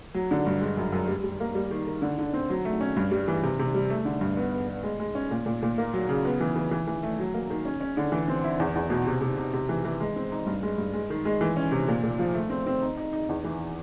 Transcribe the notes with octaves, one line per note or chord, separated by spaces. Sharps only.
F#3
D3
G2
G#3
F#2
F#2
G3
G3
A#3
G3
D#3
D#3
D3
D3
C4
F#3
A3
C#4
G2
G3
E3
C3
C3
G3
A3
D3
G2
B3
B3
B3
G#3
G#3
C#4
A#2
A#2
A#2
A#3
F#3
C#3
B3
E3
E3
E3
E3
A3
F#3
A#3
D#3
C#4
C#4
D3
E3
C4
E4
E2
E2
B2
C3
C3
C3
C3
E3
E3
G#3
C4
D#4
G2
G#3
G2
G#3
D#3
G#3
E3
C#4
C3
A#2
A#2
F3
A3
C4
C4
D#4
D#4
D#4
E2
E3